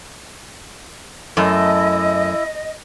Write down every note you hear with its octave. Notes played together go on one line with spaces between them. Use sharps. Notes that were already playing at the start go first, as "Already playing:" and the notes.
F#2 A3 E4 D#5